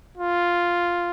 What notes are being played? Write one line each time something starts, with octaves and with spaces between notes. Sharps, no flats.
F4